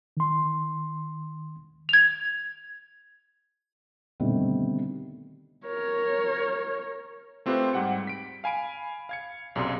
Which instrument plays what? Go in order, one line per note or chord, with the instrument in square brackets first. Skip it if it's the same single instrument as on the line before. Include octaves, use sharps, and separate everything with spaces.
[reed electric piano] D#3 C6
[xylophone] G#6 F7
[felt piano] B2 D3 D#3 G3 A3 C4
[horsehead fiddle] A#4 C#5
[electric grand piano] A3 C4 F4 G4 B4 C5
G#2 G3 F#5 G5 C#7
B6 D7
F5 G#5 B5 D7
F5 G#6 C#7
B1 F#2 C3 G#4 D5 C6